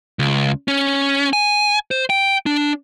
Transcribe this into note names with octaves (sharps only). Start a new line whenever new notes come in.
C#2
C#4
G#5
C5
G5
D4